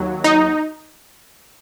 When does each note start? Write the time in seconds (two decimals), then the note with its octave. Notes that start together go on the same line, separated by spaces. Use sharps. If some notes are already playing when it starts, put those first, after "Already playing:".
Already playing: D#2 F#3
0.24 D#4